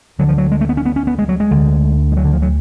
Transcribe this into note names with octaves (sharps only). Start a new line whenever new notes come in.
D2 D3 F#3
F3
F#3
G#3
A3
B3
C#4
B3
C#4
B3
G#3
F#3
G#3
D2 D3
G#3
F#3
D3
F3
F#3